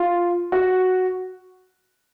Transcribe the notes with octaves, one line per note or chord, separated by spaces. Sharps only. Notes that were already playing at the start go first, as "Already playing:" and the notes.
Already playing: F4
F#4